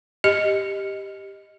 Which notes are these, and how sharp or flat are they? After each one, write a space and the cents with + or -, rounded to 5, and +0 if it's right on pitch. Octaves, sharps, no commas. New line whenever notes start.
G4 +0 D#5 +0